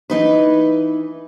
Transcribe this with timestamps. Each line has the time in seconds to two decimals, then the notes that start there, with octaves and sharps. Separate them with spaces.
0.10 E3 D#4 B4